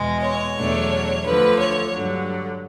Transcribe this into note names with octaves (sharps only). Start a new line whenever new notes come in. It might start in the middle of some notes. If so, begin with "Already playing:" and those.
Already playing: E2 B2 G#3
C#5
E2 B2 F#3 A3 D4
D2 D3 F3 B4
C#5
G2 D3 F#3